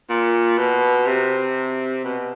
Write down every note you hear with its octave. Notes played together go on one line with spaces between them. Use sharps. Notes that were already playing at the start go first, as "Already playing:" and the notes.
A#2
B2
C3
B2